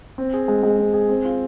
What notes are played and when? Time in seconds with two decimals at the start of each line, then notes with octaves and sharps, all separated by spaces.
0.18 C4
0.34 G#4
0.48 G#3
0.63 G#3
0.79 C4
0.94 G#4
1.09 C4
1.25 F4